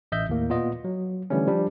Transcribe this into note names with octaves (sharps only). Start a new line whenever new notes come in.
A1 D#5 E5 G6
D#2 A2 A#3
A#2 B3 F4 D#5
F#3
D3 E3 G3 A3 C#4
F3 G3 D4